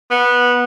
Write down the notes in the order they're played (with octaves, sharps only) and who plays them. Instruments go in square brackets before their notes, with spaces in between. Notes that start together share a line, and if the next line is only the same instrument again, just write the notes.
[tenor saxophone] B3